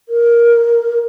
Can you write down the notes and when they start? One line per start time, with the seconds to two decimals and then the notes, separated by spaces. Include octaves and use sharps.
0.09 A#4